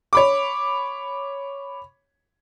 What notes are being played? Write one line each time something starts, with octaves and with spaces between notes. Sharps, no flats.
C#5 B5 D6